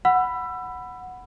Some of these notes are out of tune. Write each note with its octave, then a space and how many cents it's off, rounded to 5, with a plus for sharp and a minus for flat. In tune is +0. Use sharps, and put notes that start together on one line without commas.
F#5 +0 B5 +5 E6 +25